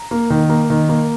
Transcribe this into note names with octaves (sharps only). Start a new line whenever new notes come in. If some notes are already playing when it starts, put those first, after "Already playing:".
Already playing: A#5
A#3
D#3
A#3
D#3
A#3